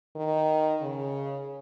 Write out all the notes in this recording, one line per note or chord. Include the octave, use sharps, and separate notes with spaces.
D#3
C#3